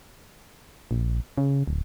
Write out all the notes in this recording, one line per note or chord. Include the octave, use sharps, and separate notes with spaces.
A#1
C#3
D1